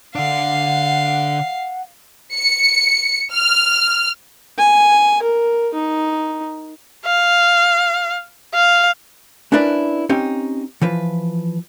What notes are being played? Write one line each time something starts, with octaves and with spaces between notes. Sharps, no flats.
D3 D4 F5 F#5
C#7
F6
G#5
A#4
D#4
F5
F5
C#4 D4 E4 A#4 B4 D5
C4 C#4 D#4 G4
E3 F3 B4